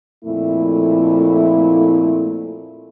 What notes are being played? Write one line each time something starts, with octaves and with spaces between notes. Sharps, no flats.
F2 A#2 A3 E4